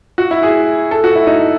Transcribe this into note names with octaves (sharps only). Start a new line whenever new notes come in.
F#4
E4
G#4
A4
F#4
E4
D#4